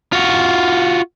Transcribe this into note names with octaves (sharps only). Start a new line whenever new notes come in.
F4 F#4